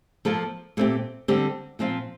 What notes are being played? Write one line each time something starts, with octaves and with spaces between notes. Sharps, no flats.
F3 A#3 F4 A4
A#2 A3 C4 G4
D3 G3 C4 G4
A#2 F3 C4 F4